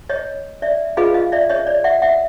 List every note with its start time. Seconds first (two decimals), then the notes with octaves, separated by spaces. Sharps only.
0.09 C#5 D#5
0.62 D5 E5
0.97 F4 G#4 B4 D#5 F5
1.14 D#5 F5
1.32 D5 E5
1.49 C#5 D#5
1.67 D5
1.84 E5 F#5
2.02 E5 F#5